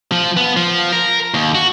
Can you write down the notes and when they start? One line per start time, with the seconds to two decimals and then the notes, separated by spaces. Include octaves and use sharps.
0.12 F3
0.37 B3
0.57 F3
0.93 A#4
1.34 D#2
1.55 F#4